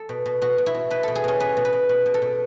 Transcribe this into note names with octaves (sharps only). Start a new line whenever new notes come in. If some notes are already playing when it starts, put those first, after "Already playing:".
Already playing: A4
B2
B2
B2 F#4
B2
E4
B2
B2 B4
B2 A4
G#4
B2 C#4
B2 B4
B2
B4
B2
B2 B4
B2
A4
B2